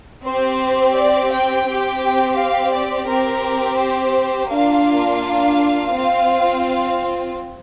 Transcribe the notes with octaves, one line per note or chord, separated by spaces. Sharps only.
C4 G4 C5
D5
G5
C4 G4
F5
D5
C4 G4 A#4
C5
A#3 D4 F4 F5
C4 F4